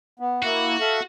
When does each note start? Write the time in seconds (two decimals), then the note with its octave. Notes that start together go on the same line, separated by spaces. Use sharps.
0.20 B3
0.43 A#3 E4 F#4
0.80 A4 E5 F5